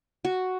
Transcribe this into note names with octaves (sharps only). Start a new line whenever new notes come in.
F#4